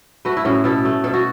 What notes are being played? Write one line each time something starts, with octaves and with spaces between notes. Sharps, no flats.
A3 F#4 B4
E4
A2 C#4 F#4
B2 E4 A4
A3
B2 A4
F#4